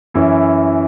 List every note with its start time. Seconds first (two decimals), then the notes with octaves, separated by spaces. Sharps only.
0.14 F#2 E3 C#4 E4